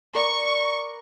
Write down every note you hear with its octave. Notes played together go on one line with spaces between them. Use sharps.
A#4 B4 D5 C#6